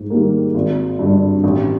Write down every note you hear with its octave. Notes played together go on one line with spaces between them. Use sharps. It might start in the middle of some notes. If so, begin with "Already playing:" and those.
Already playing: G#2
D#3 G3 A#3
G#1
G2 D3
A1